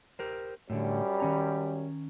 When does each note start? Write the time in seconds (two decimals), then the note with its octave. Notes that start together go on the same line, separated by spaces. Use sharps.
0.19 G4 A#4 C5
0.70 F#2 A2 D3 G3
1.20 D#3 C#4 A#5